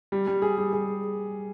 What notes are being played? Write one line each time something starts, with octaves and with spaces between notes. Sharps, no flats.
G3
G3
G#4
G3
G#4